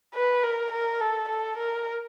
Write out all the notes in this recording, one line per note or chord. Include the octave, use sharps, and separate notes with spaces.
B4
A#4
A#4
A4
A4
A#4